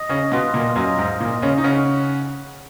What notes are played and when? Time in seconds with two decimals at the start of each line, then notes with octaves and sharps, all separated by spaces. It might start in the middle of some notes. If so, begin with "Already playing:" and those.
Already playing: D#5
0.09 C#3 C#4
0.32 B2 B3 F4
0.54 A#2 A#3
0.76 F#2 F#3 D#5
0.98 G#2 G#3
1.20 A#2 A#3 D#5
1.42 C#3 C#4
1.58 D#4
1.64 C#3 C#4 F#5